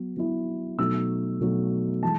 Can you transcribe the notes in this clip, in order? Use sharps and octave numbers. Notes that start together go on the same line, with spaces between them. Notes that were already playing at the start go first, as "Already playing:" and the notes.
Already playing: F#3 B3
F#3 B3 E4
B2 F#3 A3 D#4 E6
B2 F#3 A3 D#4
E3 G#3 A5